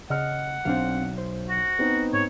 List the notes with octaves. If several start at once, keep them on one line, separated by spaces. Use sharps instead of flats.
C#3 D#5 F#5 F6
B1 C4 D4 F5
C5
F#4
B3 C4 D#4
G#2 C#5